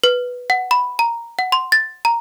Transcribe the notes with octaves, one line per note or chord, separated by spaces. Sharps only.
B4
F#5
B5
A#5
F#5
C6
A6
A#5